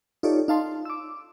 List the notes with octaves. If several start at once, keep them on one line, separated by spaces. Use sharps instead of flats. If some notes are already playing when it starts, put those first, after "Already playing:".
D#4 F4 G4 A4 C#5 D5
D#4 F5 A5 C6
D6 E6